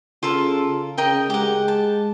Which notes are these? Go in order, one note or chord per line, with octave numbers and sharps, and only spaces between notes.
C#3 F4 A4 A#4
C#3 A#4 D#5 G5
G#3 G4 F#5
A5